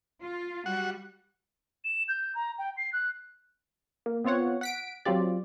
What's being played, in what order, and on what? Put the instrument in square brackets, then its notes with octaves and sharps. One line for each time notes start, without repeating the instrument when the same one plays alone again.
[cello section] F4
[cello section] G3 [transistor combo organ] F#4 F#5
[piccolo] E7
G6
A#5
G5
C7
F#6
[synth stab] A#3
B3 C4 F4 C#5 F#5
F#5 B6 D7
F#3 C4 F4 G4 D5